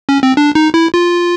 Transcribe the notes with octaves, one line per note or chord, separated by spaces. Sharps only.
C#4
C4
D4
D#4
E4
F4